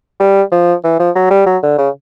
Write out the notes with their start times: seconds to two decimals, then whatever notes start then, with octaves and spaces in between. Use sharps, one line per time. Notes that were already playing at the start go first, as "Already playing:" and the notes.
0.20 G3
0.52 F3
0.84 E3
0.99 F3
1.15 F#3
1.31 G3
1.46 F#3
1.63 D3
1.78 C#3